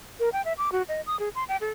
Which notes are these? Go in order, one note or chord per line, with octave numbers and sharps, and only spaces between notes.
A#4
G5
E5
D6
F#4
D#5
D#6
G#4
C6
G5
A4